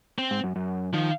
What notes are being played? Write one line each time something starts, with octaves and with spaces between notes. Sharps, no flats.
C4
G#2
F#2
F#2
D#3 F3